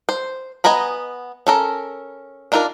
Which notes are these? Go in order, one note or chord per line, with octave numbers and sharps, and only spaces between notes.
C5
B3 D#5 G#5 A#5 B5
C#4 A4 A#4
D4 D#4 F4 A4 A#4